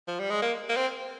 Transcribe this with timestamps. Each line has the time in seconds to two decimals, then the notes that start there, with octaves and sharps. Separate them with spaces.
0.08 F3
0.20 G3
0.30 G#3
0.42 A#3
0.69 A#3
0.76 C4